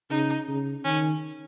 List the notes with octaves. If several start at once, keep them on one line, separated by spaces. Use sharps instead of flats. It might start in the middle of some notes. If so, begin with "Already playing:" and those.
C#3 D#4
C#3
D#3 C#4